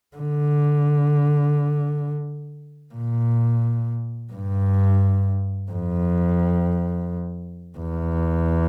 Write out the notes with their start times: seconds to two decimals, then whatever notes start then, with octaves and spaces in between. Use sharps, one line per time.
0.17 D3
2.94 A#2
4.32 G2
5.71 F2
7.78 E2